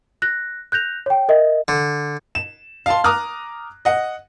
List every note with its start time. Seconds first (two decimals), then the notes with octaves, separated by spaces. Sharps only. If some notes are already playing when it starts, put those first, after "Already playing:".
0.22 F#6 A#6
0.72 F#6 G6 A#6 F7
1.06 C#5 G5
1.29 A#4 D#5 E5
1.68 D3
2.35 E7
2.86 F5 A5 C6
3.04 A#5 D6 D#6 F6 F#6
3.85 D#5 F#5